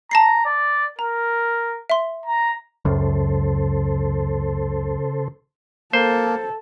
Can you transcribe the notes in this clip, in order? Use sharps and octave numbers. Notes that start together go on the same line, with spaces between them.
A5 A#5 A#6 C7
D5
A#4 A#5
E5 C6
A#5
C#2 F#2 C#3 A4 C5
A#3 A4 C5